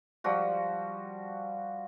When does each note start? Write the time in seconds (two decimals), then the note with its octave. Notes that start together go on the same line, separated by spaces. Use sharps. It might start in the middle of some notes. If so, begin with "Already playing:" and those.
0.24 F3 G3 F#4